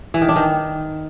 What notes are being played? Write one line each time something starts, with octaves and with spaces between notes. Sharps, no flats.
E3
D#3
D4
D#3